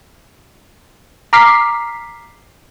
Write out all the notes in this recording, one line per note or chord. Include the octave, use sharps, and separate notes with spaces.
A#5 D6 F6 B6 C7